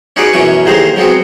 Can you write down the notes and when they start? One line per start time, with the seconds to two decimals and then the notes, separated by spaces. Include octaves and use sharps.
0.16 C#4 D#4 F#4 G#4 B4 D5
0.33 F#2 B2 E3 F#3 C#4 G#5
0.65 A1 D#2 D#3 G#4 C5 A#5
0.96 F#3 G#3 B3 C4 F#4